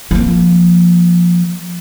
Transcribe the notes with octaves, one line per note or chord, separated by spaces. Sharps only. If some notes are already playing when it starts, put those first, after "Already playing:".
F3 A#3